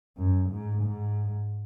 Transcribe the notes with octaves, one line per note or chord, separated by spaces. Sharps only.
F#2
G#2
G#2